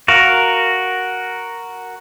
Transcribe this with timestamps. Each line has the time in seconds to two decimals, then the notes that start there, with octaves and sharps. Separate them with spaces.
0.08 F#4 A#4 F5